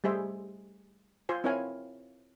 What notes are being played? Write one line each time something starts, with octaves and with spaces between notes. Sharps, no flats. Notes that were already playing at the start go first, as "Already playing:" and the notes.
G3 A3 G#4 C5 E5
F4 C5 G#5
C4 E4 A#4 C#5 F5 G#5